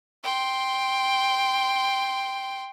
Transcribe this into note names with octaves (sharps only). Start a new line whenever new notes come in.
G5 C6